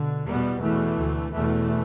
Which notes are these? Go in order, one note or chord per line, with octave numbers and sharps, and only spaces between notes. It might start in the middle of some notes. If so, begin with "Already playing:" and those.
Already playing: B2 D3
E2 B2 G3 B3
E2 B2 E3 A3
D2
E2 B2 E3 A3